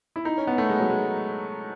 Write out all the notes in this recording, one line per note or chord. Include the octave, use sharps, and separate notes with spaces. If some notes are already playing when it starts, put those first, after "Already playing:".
E4
D#4
C#4
B3
A3
G#3
F#3
G#3